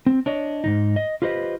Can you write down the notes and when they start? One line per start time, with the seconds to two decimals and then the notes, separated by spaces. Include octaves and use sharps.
0.06 C4
0.26 D4 C#5 D#5
0.64 G#2 C3 D#4
0.96 D#5
1.22 F4 G4 B4 C5 D#5